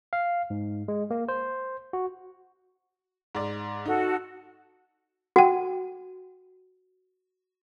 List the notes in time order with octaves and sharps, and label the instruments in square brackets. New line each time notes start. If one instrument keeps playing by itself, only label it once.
[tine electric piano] F5
G#2
G#3
A#3
C5
F#4
[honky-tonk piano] G#2 D5
[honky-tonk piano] D#4 [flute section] F#4 A4
[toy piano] F#4 [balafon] F#5 G5